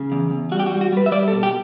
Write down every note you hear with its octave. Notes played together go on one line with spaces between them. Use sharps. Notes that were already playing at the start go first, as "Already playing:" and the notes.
Already playing: C#3
E2
E2
G3 F#4
G4
F#4
G3
F#4
G3 B4
E5
G3 D5
A4
B2
G4